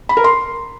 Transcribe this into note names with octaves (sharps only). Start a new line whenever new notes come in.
B5
A#4
C6